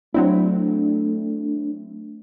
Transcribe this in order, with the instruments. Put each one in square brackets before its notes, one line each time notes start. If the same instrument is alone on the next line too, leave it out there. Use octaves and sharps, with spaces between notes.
[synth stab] F#3 C4 E4 [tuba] A3 [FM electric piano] D4